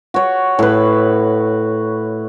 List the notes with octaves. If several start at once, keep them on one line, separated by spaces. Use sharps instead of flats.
F#4 C#5
A2 B4